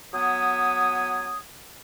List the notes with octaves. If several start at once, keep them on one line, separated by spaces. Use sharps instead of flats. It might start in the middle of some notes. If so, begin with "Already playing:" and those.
F#3 B3 G#5 D#6